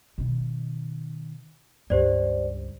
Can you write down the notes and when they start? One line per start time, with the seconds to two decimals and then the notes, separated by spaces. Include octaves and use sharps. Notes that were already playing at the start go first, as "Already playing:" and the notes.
0.18 B2 D#3
1.90 C#2 G2 G4 C5 D5